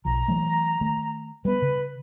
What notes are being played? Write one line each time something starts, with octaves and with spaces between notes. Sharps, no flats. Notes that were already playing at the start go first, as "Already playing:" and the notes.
B1 F3 A#5
E3 F#3 A3
D#3 A3
G3 B3 B4
C#3